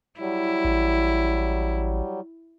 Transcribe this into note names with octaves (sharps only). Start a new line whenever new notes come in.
F#3 G3 E4
A1